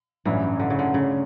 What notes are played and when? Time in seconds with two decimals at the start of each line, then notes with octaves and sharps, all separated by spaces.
0.25 A1 G2 E3 F#3 C#4 E4
0.59 D3
0.70 C#3
0.79 D3
0.94 C#3